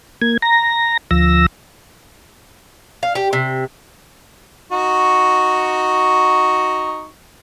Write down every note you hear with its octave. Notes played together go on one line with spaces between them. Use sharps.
A#3 G#6
A#5 A#6
D2 F3 E6 A#6
F5
G4
C3
D#4 F#4 C#6